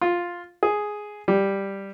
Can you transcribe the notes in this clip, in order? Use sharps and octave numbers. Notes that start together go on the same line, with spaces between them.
F4
G#4
G3